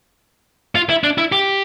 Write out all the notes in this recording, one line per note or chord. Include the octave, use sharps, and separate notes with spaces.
F4
E4
D4
E4
G4